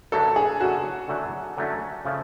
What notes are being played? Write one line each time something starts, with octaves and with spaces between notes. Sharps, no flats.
D3 F#3 A3 C#4 A4
G#4
D3 F#3 A3 C#4 F#4
D3 F#3 A3 C#4
D3 F#3 A3 C#4
C#3 F3 A3 C#4